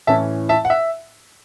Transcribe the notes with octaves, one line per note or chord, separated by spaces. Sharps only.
A2 E3 C#4 E5 A5
E5 A5
F#5
E5